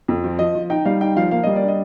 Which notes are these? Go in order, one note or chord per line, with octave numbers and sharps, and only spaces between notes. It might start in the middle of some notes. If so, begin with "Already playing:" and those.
F2
F3
F3 D#5
F3
D#4 G5
G3 F5
D#4 G5
F3 F5
A#3 F5
G3 D#5
D5
D4
D#5